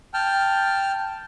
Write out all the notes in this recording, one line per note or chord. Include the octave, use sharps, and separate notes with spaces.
G5 A5 F6